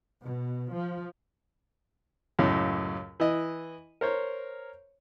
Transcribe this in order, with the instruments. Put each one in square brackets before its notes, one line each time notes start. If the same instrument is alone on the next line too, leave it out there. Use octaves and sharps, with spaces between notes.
[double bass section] B2
F3
[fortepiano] C#2 F#2 A2 C#3
E3 D#5
A#4 C5 C#5